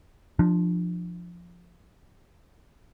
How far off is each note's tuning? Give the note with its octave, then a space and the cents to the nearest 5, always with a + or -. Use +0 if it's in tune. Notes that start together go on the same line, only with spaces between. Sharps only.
F3 +0 D4 +35